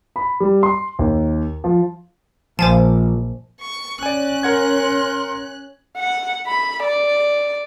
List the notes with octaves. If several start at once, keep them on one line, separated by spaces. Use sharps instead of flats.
B5
G3
C6
D#2
F3
A#1 F3 C5 G#5 A5
C#6
C#4 D5 G#5 F#6
A#4 F#5 C6 G#6
F#5
B5
D5